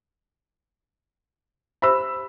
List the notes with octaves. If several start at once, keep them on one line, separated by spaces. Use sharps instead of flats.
G4 C5 E5 B5 E6